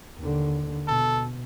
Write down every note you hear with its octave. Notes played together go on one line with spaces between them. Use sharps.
D#2 D3
B2 A4